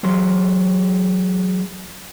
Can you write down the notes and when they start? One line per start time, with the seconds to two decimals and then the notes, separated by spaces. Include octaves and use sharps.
0.03 E3 F#3 G#3 C6